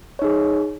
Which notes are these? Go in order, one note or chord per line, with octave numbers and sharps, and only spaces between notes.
D#4 G#4 C#5